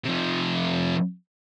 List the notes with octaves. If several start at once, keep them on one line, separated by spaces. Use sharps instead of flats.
C3 F3